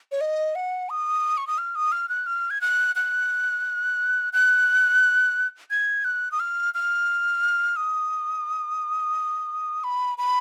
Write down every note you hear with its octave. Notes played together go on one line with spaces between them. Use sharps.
C#5
D#5
F#5
D#6
C#6
D#6
F6
D#6
F6
F#6
F6
G#6
F#6
F#6
F#6
G#6
F#6
D#6
F6
F6
D#6
B5
B5